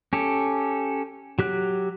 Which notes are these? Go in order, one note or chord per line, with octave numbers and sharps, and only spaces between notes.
C#4 G4 A4
F#3 G4 F#6